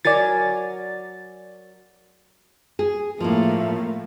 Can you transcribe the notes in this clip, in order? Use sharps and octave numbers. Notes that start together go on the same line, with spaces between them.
F#3 A#4 D5 G#5 A6
G#4
A2 F3 A3 A#3